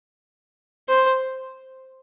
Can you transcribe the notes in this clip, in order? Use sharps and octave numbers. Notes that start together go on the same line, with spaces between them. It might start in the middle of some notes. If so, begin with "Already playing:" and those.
C5